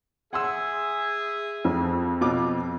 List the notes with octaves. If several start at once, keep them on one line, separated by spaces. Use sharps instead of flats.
G#4 E5 F#5 C6 E6
F2
B2 F4 D6